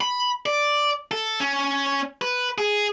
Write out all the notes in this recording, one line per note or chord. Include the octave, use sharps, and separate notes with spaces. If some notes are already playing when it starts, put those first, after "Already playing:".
B5
D5
A4
C#4
B4
G#4